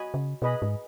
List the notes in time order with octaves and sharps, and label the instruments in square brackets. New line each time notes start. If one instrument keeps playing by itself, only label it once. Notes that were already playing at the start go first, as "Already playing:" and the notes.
Already playing: [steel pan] F#4 D#5 G#5 B5
[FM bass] C#3
[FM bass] B2 [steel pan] G#4 B4 D#5 B5
[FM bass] G#2